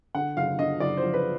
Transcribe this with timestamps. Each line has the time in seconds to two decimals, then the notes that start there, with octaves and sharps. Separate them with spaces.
0.15 D3 F#5
0.37 F#1 F5
0.59 D3 D#5
0.80 F#1 D5
0.97 C5
1.03 F3
1.14 B4